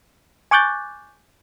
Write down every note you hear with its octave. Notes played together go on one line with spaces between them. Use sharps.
G#5 C#6 D6 F#6 G6 A6